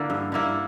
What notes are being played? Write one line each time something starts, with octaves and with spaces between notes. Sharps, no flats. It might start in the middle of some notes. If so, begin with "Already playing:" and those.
Already playing: D3 A#3 E4
G2
D3 A#3 E4